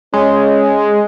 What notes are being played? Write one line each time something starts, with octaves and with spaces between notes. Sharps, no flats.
G#3 C#4